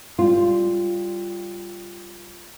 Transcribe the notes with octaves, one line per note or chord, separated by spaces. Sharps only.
G3 F4